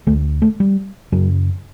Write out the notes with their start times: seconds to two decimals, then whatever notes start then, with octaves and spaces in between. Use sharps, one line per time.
0.07 D2 D3 A3
0.42 A3
0.60 G3
1.12 F#2 C#3 F#3